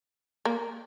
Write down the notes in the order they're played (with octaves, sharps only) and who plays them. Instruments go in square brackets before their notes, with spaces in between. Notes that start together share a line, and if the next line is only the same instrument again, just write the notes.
[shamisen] A#3